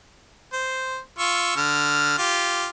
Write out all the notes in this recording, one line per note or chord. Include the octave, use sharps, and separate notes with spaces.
C5
F4 C#6 E6
D3 F6
F4 G4